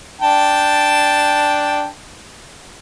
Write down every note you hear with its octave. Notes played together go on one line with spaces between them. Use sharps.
D4 G5 A5